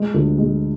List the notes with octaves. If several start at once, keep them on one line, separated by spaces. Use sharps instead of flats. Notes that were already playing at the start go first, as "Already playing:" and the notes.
Already playing: G#3
D2
G#3